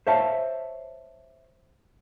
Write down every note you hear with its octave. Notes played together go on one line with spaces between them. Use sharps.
C5 C#5 E5 F5 A5